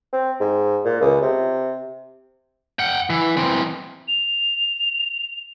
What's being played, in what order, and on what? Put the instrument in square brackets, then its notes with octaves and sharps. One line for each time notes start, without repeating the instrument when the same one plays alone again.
[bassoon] C4
G#2
A#2
C#2
C3
[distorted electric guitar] F#5 G5
E3
E3 C4
[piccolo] F7